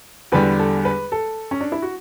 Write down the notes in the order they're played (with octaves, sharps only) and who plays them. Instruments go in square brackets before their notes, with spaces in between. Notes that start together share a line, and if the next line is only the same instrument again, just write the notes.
[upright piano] E2 D3 G3 B4
A4
B4
A4
C#4
D4
E4
F#4